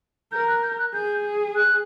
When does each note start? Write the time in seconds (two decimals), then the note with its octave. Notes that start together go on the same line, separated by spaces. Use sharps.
0.32 A#4 G6
0.48 F#6
0.63 G6
0.79 F#6
0.94 G#4 G6
1.56 F#6